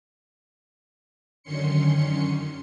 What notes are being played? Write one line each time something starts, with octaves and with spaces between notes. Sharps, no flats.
F#2 D3 D#3 C#4 C6 C#7